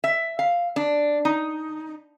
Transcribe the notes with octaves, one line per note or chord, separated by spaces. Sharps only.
E5
F5
D4
D#4